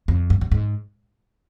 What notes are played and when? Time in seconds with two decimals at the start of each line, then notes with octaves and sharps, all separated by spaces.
0.08 F2
0.30 G2
0.41 G2
0.52 G#2